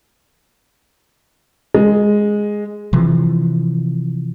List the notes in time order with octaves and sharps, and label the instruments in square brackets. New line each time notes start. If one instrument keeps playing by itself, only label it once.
[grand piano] G#3
[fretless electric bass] C3 E3 F3